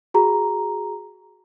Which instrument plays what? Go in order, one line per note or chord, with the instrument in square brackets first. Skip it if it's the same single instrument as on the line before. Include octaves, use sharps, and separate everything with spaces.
[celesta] F#4 G#4 A#5